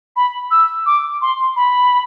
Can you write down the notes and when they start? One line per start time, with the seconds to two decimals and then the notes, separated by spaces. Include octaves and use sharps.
0.16 B5
0.51 E6
0.86 D6
1.22 C6
1.56 B5